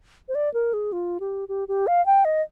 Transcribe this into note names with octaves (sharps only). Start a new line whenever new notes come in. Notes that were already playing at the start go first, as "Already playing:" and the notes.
C5
D5
A#4
G#4
F4
G4
G4
G4
F5
G5
D#5